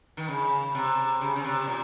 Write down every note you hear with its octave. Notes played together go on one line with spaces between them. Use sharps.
D#3
C#3
C3
C#3
C#3
C3
A#2